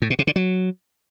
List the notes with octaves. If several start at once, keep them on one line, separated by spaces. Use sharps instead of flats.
A2
B2
C3
D3
F#3